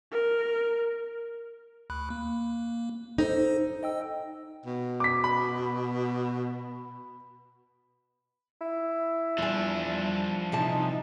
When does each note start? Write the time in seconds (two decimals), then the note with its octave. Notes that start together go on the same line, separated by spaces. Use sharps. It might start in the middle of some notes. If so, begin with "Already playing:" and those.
0.12 A#4
1.90 D2 B5 F#6
2.10 A#3
3.18 D#4 A4 C5
3.83 D#5 G5 E6
4.66 B2
5.00 D6 B6
5.24 B5
8.61 E4
9.38 E2 F3 G3 D4 G#5
10.52 C3 E3 D#4 E4 A5